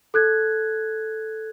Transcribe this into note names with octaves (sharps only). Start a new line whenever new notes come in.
A4 F#6 G#6